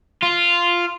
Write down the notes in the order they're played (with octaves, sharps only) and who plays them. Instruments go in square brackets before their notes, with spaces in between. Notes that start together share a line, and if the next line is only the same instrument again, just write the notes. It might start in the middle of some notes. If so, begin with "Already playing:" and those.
[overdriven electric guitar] F4